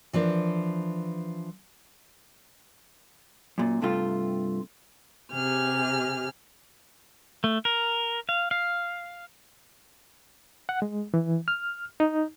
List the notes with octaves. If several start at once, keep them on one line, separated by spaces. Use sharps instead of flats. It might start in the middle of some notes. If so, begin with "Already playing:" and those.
E3 F3 D4 A#4
F#2 A#2
G2 C3 A3 F4
C3 G4 G#4 F6
A3
A#4
F5
F5
F#5
G#3
E3
F6
D#4